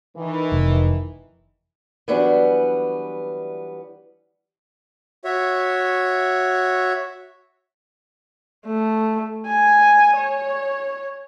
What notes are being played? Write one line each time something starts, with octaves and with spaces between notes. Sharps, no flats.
D#3 E3
F1
E3 F#3 G3 B3 D4
F#4 C#5 E5
A3
G#5
C#5